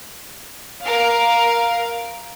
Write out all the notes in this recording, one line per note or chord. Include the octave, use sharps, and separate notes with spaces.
A#4 F5